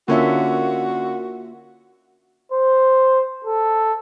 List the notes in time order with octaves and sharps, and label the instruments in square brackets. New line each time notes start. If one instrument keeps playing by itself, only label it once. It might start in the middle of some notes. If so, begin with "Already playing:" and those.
[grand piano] D3 C#4 D4 [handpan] A#3 F4 E5 [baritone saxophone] F#4
[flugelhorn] C5
A4